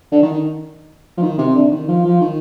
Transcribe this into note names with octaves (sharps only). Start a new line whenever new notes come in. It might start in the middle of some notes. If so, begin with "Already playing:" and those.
D3
D#3
F3
D#3
C3
D3
D#3
F3
F3
D#3